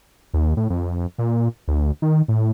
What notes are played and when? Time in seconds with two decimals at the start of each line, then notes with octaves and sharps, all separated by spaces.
0.33 D#2
0.57 A2
0.70 F2
1.18 A#2
1.68 D2
2.02 D#3
2.28 A2